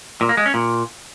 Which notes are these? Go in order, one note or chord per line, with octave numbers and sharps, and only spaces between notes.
A#2
A#3
G#3
C#4
A#2